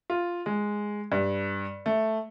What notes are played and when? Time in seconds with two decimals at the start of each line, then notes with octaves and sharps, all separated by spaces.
0.10 F4
0.46 G#3
1.12 G2
1.86 A3